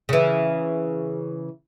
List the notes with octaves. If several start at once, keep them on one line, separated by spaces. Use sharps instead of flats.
C#3 E3